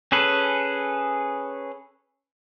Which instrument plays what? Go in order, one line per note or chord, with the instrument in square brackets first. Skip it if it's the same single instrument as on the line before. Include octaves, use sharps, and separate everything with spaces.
[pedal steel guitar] C#4 G#4 A4 B4